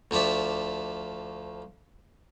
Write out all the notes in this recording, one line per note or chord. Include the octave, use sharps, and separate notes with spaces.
D2 F3 C#5 D5 E5